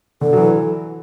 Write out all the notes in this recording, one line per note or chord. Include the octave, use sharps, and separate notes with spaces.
D3 A4
F#3
E3